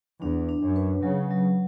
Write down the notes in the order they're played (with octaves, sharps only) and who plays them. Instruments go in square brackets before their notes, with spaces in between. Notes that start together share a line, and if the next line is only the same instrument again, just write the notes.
[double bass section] E2 [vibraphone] D4
[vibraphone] D4
[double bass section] F#2
[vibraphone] B4
[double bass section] C#3 [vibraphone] F#3
[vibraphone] F#3